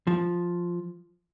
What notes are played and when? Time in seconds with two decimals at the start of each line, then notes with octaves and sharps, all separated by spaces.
0.07 F3